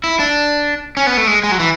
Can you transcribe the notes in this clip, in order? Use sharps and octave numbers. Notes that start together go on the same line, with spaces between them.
E4
D4
C#4
B3
A3
G#3
G#3
F#3
E3